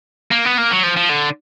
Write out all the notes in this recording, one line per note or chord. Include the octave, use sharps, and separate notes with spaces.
A#3
B3
A#3
F#3
F3
F3
D3